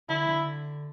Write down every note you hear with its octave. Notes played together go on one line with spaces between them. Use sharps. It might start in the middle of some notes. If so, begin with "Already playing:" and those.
D3 E4
D3